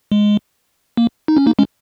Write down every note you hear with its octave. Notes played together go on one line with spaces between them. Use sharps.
G#3
A#3
D#4
C#4
A#3 D#4
G#3 C#4